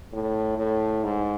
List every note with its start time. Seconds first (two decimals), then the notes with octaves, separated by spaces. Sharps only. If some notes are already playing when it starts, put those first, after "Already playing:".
0.13 A2
0.58 A2
1.04 G#2